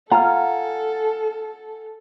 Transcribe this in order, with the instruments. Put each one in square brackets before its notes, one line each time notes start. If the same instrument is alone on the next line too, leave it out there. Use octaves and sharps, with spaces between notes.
[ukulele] F4 A#5 [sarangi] A4 [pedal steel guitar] F#5 G#5 F6